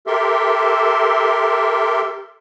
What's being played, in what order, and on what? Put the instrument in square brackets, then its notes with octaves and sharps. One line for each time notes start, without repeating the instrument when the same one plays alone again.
[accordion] G4 A4 A#4 E5 C6